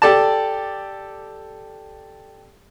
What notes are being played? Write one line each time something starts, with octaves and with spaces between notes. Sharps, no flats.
G4 A4 D5 A5